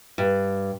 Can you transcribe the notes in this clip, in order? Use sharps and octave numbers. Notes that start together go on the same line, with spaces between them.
G2